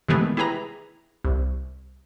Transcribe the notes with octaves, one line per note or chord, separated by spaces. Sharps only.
C3 D#3 E3 G#3 A3 B3
E4 G4 G#4 B4 A#5
C2